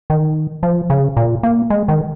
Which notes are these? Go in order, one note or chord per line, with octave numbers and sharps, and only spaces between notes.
D#3
F3
C#3
A#2
A#3
G#3
D#3